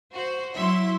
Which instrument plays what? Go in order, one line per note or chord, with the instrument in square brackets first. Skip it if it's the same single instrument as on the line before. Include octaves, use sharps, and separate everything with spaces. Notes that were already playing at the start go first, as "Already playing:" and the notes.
[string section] F#4 [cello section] C5
[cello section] F#3 E4 [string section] E5 C6